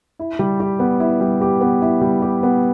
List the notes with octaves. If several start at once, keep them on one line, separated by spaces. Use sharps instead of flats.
E4
G3
G4
B3
E4
G3
G4
B3
E4
G3
G4
B3